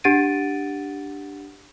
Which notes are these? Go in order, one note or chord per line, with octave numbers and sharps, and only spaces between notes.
D4 G4 F#5 A6 D7 D#7